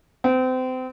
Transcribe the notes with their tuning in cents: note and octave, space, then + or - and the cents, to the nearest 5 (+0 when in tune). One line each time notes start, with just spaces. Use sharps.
C4 -30